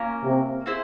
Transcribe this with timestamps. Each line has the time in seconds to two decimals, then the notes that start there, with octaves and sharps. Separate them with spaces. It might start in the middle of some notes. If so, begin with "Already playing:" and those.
Already playing: A#3 C#4 F4 A#4
0.24 C3
0.66 C4 E4 G#4 C5